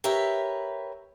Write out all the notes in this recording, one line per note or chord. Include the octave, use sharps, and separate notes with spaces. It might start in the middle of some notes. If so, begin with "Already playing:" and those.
G4 A#4 B4 C#5 E5